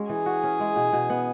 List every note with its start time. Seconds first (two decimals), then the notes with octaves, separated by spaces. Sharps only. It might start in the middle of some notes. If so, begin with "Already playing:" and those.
Already playing: G#3 C#4 F#4
0.09 E3 G#4
0.26 F#4
0.44 C#4
0.60 G#3
0.76 B2
0.93 B2
1.10 B3